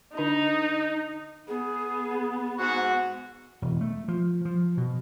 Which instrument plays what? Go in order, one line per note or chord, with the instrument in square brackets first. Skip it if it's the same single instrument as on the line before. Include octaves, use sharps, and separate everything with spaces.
[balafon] D3 D4 D#5 [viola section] D#4
[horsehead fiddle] B3 [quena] G#4
[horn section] G#2 F#4
[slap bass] E1
A3
F3
F3
B2